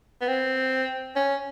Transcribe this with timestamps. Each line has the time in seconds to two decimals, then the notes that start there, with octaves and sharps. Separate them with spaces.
0.21 B3
0.28 C4
1.15 C#4